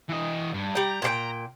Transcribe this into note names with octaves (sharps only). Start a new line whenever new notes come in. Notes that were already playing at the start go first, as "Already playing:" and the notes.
E3 D#5
G2
G3 G5 A#5
A#2 G4 G5